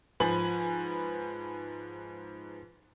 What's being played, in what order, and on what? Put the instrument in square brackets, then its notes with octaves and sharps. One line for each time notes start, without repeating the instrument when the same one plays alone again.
[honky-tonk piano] G#2 F3 B4 G#5 B5 F#7